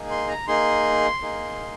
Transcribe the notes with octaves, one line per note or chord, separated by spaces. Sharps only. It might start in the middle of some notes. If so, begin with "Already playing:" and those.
Already playing: A#3 D#4 G#4
C6
A#5
A#3 D#4 G#4 C6
A#3 D#4 G#4